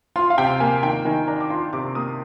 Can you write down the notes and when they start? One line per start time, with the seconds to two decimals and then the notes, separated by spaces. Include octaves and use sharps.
0.16 F4 C6
0.30 F5
0.38 C3 G5
0.60 A#3 G#5
0.83 D#3 G5
1.05 D#3 G#5
1.27 D4 A#5
1.40 D6
1.50 F4 C6
1.73 C3 D6
1.95 A#3 D#6